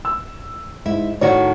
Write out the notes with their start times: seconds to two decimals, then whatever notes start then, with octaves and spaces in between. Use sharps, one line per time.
0.05 E6
0.86 G#2 E4
1.21 A2 D#3 F#4 C#5